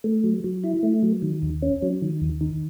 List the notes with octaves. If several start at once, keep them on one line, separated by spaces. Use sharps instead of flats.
A3
F#3
F#3
E4
A3
F#3
D#3
D#2
C#4
F#3
D#3
D#2
D#3